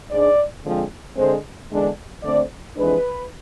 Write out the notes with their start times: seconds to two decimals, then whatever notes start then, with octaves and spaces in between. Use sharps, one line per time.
0.10 G#2 G#3 D4 D5
0.64 D3 F3 G#3 C4
1.16 D3 G#3 C4 C5
1.70 E2 D3 G#3 D4
2.23 D3 A3 C4 D5
2.76 F2 E3 G#3 D4 B4